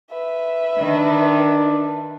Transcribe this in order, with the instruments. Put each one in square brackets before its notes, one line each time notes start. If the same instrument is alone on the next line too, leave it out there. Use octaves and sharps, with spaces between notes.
[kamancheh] B4 E5
[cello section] D#3 [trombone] D4